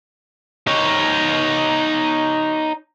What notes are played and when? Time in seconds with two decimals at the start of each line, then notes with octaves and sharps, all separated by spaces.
0.67 D#4 C#5